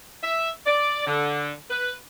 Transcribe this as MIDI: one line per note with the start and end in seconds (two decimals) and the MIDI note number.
0.23 0.50 76
0.66 1.05 74
1.07 1.52 50
1.70 1.94 71